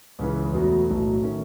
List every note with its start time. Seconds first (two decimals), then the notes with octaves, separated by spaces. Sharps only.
0.19 C#2 C#3 E3
0.53 E2 B2 F#3 A3
0.88 B1 A2 F#3
1.23 D#3 A3 C#4